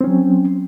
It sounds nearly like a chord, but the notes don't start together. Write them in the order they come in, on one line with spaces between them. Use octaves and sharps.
C4 C#4 F#3